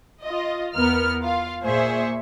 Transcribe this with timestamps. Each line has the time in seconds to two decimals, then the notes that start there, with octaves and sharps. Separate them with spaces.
0.22 F4 D#5
0.75 E2 B3 A#4 F6
1.21 F4 F5
1.64 A#2 G#4 C5 E5 C#6